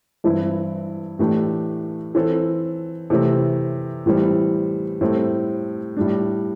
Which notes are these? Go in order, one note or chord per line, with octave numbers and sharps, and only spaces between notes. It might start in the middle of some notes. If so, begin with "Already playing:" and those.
G2 E3 C4 E4
A2 E3 A3 D4 G4
E3 C4 A4
C3 E3 A3 C4
A2 E3 G3 C4
A2 G3 C4 A4
A2 G3 D4